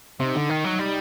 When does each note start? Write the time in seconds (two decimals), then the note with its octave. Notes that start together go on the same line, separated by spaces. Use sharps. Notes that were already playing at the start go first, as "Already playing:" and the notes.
0.20 C3 D#4
0.35 D3
0.49 D#3
0.64 F#3
0.79 G3